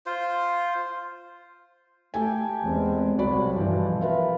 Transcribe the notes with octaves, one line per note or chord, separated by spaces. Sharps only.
F4 C5
A3 G4 A4 G5 G#5
E2 G#3 C4
C2 F#3 G3 F#4 D5 B5
G2 B2 E3 F3
F4 A#4 B4 E5